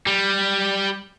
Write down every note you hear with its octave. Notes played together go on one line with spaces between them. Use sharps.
G3